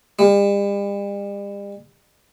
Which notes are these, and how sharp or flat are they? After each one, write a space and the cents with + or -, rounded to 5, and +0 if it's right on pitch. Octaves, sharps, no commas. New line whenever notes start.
G3 +40